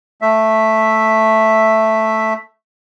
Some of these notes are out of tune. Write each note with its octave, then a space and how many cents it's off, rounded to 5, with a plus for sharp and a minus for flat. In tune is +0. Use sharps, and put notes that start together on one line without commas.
A3 +0 E5 +0